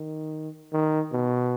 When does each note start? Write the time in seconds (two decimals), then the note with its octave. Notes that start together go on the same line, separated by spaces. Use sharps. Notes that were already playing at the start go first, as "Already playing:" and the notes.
Already playing: D#3
0.73 D#3
1.12 B2